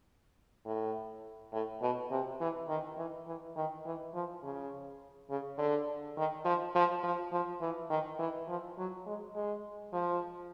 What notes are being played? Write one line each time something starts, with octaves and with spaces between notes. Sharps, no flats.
A2
A2
B2
C3
E3
D#3
E3
E3
D#3
E3
F3
C#3
C#3
D3
D#3
F3
F3
F3
F3
E3
D#3
E3
F3
F#3
G#3
G#3
F3